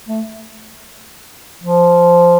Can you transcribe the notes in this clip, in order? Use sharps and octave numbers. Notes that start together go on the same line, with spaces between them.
A3
F3